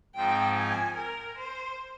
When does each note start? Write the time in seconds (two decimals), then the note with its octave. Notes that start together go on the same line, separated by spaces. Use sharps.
0.15 G#2 F3 C4 D#4 G5
0.56 G#5
0.96 A#4
1.38 C5